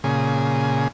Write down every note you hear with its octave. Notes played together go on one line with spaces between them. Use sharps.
A#2 C#3 G#4